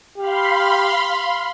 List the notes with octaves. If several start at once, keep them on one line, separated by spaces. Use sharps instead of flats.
G4 F5 B5 C6